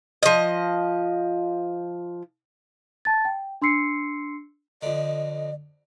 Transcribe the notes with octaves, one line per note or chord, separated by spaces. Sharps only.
F3 D#5
A5 A6
G5
D4 C6 E6 C7 C#7
F2 D3 D#5